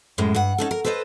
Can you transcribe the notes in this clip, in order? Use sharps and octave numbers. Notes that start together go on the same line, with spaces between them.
F#2 A2 G#3
G2 F#5
C#4 D#4 A4
A#4
A4 B4 C5 D5 D#5